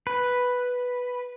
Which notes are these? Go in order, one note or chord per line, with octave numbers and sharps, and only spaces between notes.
B4